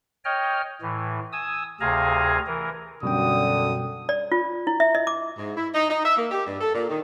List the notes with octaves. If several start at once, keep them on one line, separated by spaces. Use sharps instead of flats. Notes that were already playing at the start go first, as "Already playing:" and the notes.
C#5 D#5 G5 F6
A2 E3
G#5 D#6 E6
D2 C3 G#4 F5 G#5 A#5
E3 A#4
F#2 B2 D3 G3 G5 D#6
D5
F4
E4
E5
D#5
D6
G#2
E4
D#4
D#4
E5
A#3
G4
G2
A4
A#2
D#3